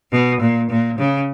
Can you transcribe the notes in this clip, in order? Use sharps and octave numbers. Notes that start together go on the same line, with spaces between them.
B2
A#2
A#2
C#3